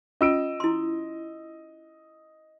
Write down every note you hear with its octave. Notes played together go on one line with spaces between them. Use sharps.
C#4 F4 D#5 E6 D7
E4 C6